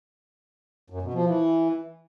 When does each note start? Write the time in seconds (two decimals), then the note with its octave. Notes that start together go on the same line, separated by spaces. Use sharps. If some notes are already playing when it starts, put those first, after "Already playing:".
0.90 F#2
1.02 B2
1.14 F3
1.26 E3